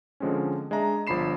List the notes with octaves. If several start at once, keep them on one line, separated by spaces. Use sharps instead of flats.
D3 F3 G#3 C4 C#4
G#3 D4 E5 A#5
G1 F3 D4 B5 C7 E7